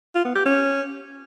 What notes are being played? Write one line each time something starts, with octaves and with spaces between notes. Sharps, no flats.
F4
B3
G4
C#4